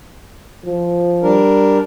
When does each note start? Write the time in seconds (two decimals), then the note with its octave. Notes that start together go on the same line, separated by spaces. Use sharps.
0.66 F3
1.23 G3 D4 A#4